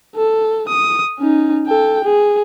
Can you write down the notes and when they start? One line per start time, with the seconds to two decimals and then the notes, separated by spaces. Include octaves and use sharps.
0.16 A4
0.69 D#6
1.19 C#4 D#4
1.67 A4 G5
2.04 G#4